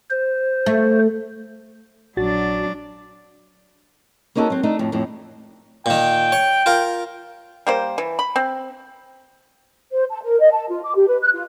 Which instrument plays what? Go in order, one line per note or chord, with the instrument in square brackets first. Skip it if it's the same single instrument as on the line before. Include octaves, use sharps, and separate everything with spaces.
[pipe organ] C5
[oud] A3
[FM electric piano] A#1 F#4 A6 [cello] F#3 D4
[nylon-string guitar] A#3 C#4 D#4 F#4 A4
F#3 C4
A3 D4 D#4
F2 A2
F2 A2
[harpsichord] A#2 D#3 [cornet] G5
[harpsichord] C#5
F4 A#4
[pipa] G3 A#3 C5
E3
B5
C4
[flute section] C5
A5
A#4
D#5
A5
F4
D6
G4
B4
F#6
F4